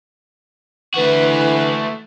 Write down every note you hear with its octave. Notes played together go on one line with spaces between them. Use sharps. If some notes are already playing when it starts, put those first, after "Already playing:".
D3 E3 A3 F#4 B4